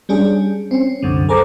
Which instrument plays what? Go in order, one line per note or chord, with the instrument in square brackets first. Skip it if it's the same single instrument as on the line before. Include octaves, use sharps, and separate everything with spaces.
[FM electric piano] G3 C#4 D4 G#4
C4 C#4
C2 F#2 D3
G#4 A4 C5 A#5 D6